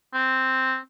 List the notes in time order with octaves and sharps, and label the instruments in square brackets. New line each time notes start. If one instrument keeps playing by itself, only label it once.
[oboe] C4